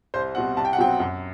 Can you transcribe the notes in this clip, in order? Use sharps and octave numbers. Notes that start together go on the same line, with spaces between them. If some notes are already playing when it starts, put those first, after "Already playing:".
C2 C5
B2 G3 C4 F#5
C2 A5
G5
F#5
B2 F#3 C4 G5
F#2